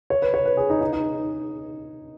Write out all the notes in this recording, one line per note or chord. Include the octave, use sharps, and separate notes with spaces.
C#5
B4
C#5
B4
G#4
D#4
D#4
D#4